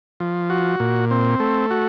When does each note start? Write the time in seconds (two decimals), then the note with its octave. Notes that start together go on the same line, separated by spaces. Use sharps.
0.20 F3
0.50 F#4
0.80 A#2
1.11 C4
1.40 A3
1.70 F#4